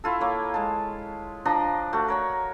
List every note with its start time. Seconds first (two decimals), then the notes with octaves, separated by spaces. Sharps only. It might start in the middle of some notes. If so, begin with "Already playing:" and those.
0.04 E4 F4 A4
0.21 A#3 C#5
0.54 G#3 A5
1.45 F3 D4 D#5 A#5
1.93 A3 F#4
2.08 A#4 C#5 F#5